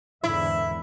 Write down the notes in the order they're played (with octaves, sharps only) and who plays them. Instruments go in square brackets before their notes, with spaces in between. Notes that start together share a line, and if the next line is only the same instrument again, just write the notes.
[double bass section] E2 G#2 D3 [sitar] E4 [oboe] E5